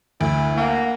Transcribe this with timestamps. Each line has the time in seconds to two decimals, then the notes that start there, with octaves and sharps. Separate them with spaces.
0.21 D2 E4
0.57 A#3 F#5